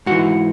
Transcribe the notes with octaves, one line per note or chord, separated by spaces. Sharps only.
G#2 E3 F#4 F#5